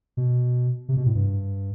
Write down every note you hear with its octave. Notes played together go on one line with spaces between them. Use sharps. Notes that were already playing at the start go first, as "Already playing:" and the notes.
B2
C3
B2
A2
G2